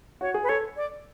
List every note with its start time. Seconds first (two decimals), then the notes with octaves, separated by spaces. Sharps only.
0.21 F#4 C#5
0.34 G#4
0.43 B4
0.49 A4 C#5
0.77 D5